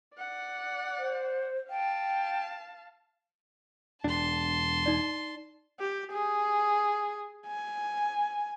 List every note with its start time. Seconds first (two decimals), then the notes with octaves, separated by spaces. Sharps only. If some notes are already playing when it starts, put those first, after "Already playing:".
0.17 D5 F#5
0.98 C5
1.70 F5 G5 A5
4.04 E1 D4 A5 C6
4.86 D#4 D5
5.80 G4
6.12 G#4
7.46 G#5